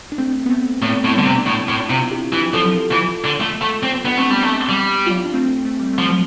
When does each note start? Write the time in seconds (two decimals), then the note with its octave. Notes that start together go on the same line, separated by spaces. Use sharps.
0.12 D4
0.18 A3 C4
0.46 B3
0.50 A3 C4
0.82 A2 A3
1.04 A2
1.08 A3
1.15 D3 G3 B3
1.25 C3
1.38 D4
1.46 A2 C4 E4
1.69 A2
1.79 D4 F4
1.90 C3
2.11 E4 G4
2.33 E3
2.44 G4
2.54 F3 A4
2.65 E4 G4
2.76 F4 A4
2.92 E3
3.24 D3
3.40 A3
3.61 A3
3.83 C4
4.05 B3 D4
4.17 A3 C4
4.30 G3 B3 D4
4.43 A3
4.69 G3
5.06 F4
5.15 E4
5.25 D4
5.33 A3 C4
5.65 A3
5.79 G3
5.93 F3 A3